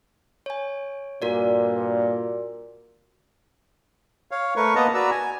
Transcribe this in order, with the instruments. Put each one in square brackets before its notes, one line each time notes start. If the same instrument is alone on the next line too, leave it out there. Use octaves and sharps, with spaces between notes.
[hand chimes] C#5 G#5
[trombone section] G2 A#2 [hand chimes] F#4 A#4 D5
[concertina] C#5 F5
A3 A#4 B4 C#6
A#3 B3 B4 D#5 A5 A#5
F#4 B4 D5 A#5 E6
G#5